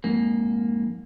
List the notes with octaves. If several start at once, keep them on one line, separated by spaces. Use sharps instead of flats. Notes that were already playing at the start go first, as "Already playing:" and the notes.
F2 G#2 A#3